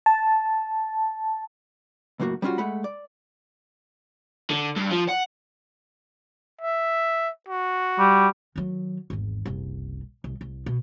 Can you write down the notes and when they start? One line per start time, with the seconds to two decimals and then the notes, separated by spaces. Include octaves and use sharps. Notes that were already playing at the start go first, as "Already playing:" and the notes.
0.06 A5
2.20 C#2 F#2 A2 A#3 F#4
2.42 G3 B3 C#4 D4 F4 F#4
2.58 G#3 A3 F#5 B5
2.84 D5
4.50 D3
4.76 G2
4.91 F3
5.09 F#5
6.61 E5
7.48 F#4
7.99 G3
8.56 D#3 F#3
9.10 G#1 E2
9.45 F#1 C2
10.24 C2
10.41 C2
10.66 B2